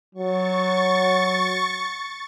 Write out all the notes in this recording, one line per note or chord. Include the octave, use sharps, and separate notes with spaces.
F#3 C#6 A6